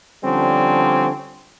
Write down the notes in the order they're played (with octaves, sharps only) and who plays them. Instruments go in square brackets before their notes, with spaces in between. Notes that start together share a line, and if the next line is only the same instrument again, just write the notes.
[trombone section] D3 F3 G3 C4 C#4